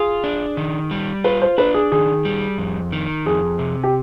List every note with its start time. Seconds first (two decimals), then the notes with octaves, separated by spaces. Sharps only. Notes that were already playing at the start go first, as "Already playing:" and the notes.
Already playing: F4 G#4
0.24 D4
0.57 D#3
0.91 G3
1.24 F4 B4
1.42 C5
1.58 D4 B4
1.74 G#4
1.92 D#3 G#4
2.25 G3
2.58 F2
2.93 D#3
3.26 F2 G#4
3.59 C3
3.84 G4